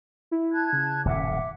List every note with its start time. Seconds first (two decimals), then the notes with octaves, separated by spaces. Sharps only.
0.31 E4
0.52 A5 F#6 G#6
0.73 C#3
1.05 D#1 F#2 A2 E5 F#5 D6